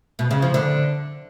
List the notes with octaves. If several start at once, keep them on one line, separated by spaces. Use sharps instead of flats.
B2
C#3
F3
D3